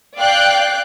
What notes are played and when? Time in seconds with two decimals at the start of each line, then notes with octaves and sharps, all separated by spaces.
0.18 D5 F5 G5 F#6 G6